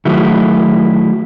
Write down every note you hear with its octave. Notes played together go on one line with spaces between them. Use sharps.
D#3 F#3 A3 E4 F#4 G#4